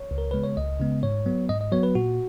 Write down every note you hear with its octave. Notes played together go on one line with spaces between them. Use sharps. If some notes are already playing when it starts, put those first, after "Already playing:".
Already playing: C#5
C#2
A#4
C#3 G#3 B3 B4
C#5
C#2 D#5
C#3 G#3 B3
G#2 C#5
F#3 B3
G#2 D#5
D#5
F#3 B3 C#5
B4
A#2 F#4